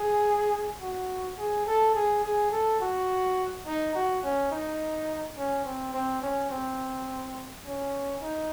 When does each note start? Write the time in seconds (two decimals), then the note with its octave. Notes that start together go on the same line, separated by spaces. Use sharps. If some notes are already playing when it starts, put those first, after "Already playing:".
Already playing: G#4
0.81 F#4
1.38 G#4
1.66 A4
1.95 G#4
2.24 G#4
2.52 A4
2.81 F#4
3.66 D#4
3.95 F#4
4.23 C#4
4.51 D#4
5.37 C#4
5.65 C4
5.94 C4
6.22 C#4
6.51 C4
7.65 C#4
8.22 D#4